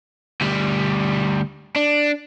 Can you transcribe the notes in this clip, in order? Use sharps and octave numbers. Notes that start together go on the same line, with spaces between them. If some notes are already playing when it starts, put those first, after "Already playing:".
D2 G3
D4